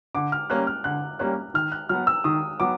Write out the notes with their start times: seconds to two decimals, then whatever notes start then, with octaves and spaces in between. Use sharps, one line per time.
0.15 D3 D6
0.32 F6
0.50 G3 A#3 C#4 F#6
0.67 F6
0.84 D3 F#6
1.19 G3 A#3 C#4 F#6
1.54 D#3 F6
1.72 F#6
1.89 F#3 B3 F6
2.07 E6
2.24 D#3 D#6
2.60 F#3 B3 D6